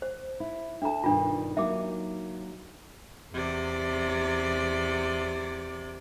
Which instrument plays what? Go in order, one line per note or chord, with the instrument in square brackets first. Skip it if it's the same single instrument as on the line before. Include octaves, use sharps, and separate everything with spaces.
[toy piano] C5
[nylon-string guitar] E4
[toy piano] D4 A4 A#5 [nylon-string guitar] E5 A5
[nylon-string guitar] G2 B2 D#3 [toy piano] D4 F4
[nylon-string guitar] F#3 A#3 D#4 [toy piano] E5 D6
[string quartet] E2 C3 D5